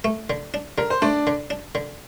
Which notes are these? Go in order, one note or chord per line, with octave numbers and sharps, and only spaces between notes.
A3
D3
D4
D3 A#4
C5
A3 D4 D5
D3
D4
D3